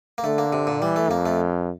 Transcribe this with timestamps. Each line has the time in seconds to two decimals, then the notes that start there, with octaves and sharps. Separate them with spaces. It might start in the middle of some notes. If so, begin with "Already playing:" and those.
0.18 A#3
0.24 D3 A3
0.38 A#3
0.53 C3
0.67 A#2
0.81 E3 G3
0.96 A3
1.10 F2 A#3
1.26 A3